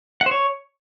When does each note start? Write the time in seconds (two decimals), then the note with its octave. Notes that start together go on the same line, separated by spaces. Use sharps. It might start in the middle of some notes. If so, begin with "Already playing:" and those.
0.21 F#5
0.26 C5
0.31 C#5